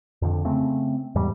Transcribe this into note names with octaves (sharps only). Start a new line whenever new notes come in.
F2 D3
C#3 A3 C4
E2 G#2 G3